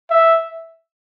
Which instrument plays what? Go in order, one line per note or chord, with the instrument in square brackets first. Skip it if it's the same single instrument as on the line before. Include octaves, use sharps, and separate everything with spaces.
[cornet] E5